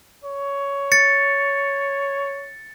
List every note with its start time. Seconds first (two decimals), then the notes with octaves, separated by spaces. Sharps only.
0.24 C#5
0.92 A6 C#7